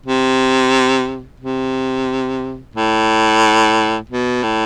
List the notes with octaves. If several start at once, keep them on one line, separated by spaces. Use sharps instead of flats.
C3
C3
A2
B2
A2